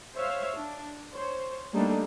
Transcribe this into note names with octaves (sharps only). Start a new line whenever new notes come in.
C5 C#5 E5 F5
D4
C5 C#5
G3 A3 A#3 D4 D#4 A4